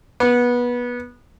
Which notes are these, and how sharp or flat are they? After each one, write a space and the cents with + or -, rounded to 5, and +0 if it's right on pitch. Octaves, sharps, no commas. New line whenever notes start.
B3 -20